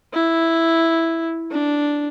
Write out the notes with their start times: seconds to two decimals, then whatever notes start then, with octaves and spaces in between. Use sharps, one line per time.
0.14 E4
1.51 D4